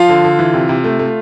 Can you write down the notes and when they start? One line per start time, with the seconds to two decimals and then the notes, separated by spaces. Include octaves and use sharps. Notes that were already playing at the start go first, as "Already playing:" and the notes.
Already playing: F3 F4 F5
0.09 D3
0.24 D3
0.39 E3
0.54 C3
0.69 C3
0.84 A3
0.99 A3